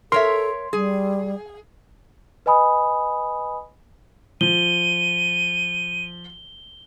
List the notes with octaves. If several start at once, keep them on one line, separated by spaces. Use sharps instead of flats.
A4 A#4 C#5 E5 C6
G3 G#4
B4 D#5 G#5 B5 D#6
F3 D#7 G7